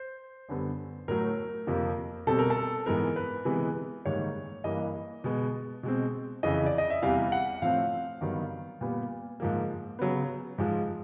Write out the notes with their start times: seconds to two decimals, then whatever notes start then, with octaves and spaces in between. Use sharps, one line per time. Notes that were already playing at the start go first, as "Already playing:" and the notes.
Already playing: C5
0.49 F#2 D3 G3 B3
1.08 A2 F#3 A3 A#4
1.67 F2 C3 F3 A#3
2.27 B2 G3 C4 A4
2.39 A#4
2.50 A4
2.86 G#2 E3 G#3 B3 A#4
3.16 B4
3.45 C3 E3 G#3 B3
4.05 G#2 D#3 G3 A#3 C#5
4.64 G2 E3 G3 A#3 D#5
5.24 B2 G#3 B3
5.83 B2 G#3 C4
6.43 F2 C#3 E3 D#5
6.66 D5
6.78 D#5
6.90 E5
7.02 E2 C3 E3 G3 F5
7.32 F#5
7.62 A2 F3 A3 C4 F5
8.21 G2 D#3 F#3 B3
8.81 A#2 G3 B3
9.40 G#2 F3 A#3
9.99 C#3 F#3 B3
10.58 G#2 F3 G#3